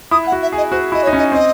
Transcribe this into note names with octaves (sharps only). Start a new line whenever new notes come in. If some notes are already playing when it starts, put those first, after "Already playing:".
E4 D#6
F#5
F#4
E5
G#4 D#5
F#4 C5
E4 D#5
C#5
D#4
C#4 D#5
C4 D#5